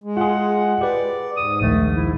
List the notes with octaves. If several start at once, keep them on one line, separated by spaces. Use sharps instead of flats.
G#3
F4 G#4 F#5
G4 B4 D5
G#2 D#6
A#1 D#2 D#3 A3
E4